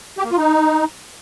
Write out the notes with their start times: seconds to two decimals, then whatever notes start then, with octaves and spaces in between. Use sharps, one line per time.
0.18 G4
0.24 A#3
0.31 F4
0.37 D#4